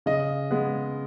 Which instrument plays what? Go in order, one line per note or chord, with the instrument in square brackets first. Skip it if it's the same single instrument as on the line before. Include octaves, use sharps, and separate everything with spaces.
[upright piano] C#3 D#5
G#3 B3